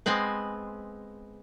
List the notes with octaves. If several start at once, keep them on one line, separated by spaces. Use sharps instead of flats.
G#3 B3 C4 B4